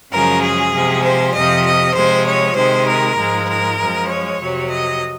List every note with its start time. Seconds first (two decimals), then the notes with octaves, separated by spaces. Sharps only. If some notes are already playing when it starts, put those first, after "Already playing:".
0.11 F#2 C#3 F3 G#3 A#4
0.42 G#4
0.73 C3 F3 G#3
1.03 C5
1.34 F2 C3 F3 D#5
1.64 D#5
1.95 C3 F3 G#3 C5
2.26 C#5
2.56 C3 D#3 G#3 C5
2.87 A#4
3.17 G#2 F3 G#3
3.48 A#4
3.78 F#2 F3 G#3
4.09 C#5
4.39 F2 C3 F#3
4.70 D#5